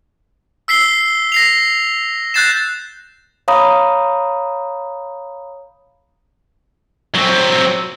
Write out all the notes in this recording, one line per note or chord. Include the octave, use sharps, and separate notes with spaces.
E6 B6 C7 G7
A#6 C7 F7
F#6 G6 A6 C7 E7
C#5 F5 A#5 B5 D#6
F#3 C4